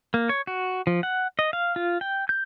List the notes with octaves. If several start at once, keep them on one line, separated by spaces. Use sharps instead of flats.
A#3
C#5
F#4
F3
F#5
D#5
F5
F4
G5
G6